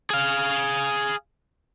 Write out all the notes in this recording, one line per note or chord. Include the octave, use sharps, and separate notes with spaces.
G#4 F5